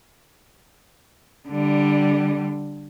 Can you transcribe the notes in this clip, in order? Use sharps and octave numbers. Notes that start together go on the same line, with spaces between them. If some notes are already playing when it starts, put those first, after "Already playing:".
D3 G3